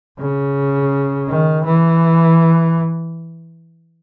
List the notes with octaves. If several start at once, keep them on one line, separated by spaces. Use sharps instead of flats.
C#3
D#3
E3